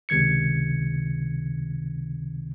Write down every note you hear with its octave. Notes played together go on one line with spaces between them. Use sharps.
C#2 C3 D#3 G#6 C#7